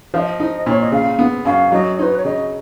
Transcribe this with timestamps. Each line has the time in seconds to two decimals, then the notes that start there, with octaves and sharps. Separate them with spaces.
0.13 F3 D#5 F5
0.40 D#4
0.66 A#2 C#5
0.80 D#5
0.92 C#3 F5
1.19 B3
1.45 F#2 F5
1.72 F#3 D#5
1.98 D#4 B4 C#5
2.16 C#5
2.25 C#3 D#5